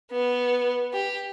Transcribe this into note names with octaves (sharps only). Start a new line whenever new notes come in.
B3
G4